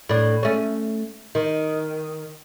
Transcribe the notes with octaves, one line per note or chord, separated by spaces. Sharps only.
A2 D4
A3 C#4
D#3